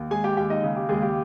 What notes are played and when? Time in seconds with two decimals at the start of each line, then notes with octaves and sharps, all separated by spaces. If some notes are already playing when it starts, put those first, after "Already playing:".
Already playing: D#2
0.11 G#3 G#4 G#5
0.24 G4 G5
0.37 D#2 G4 G5
0.50 D#4 D#5
0.63 C#3
0.76 G4
0.89 D#2 G#3 G#4
1.03 G4